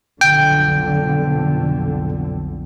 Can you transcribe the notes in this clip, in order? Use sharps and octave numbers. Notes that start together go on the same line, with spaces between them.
B1 F2 D3 G5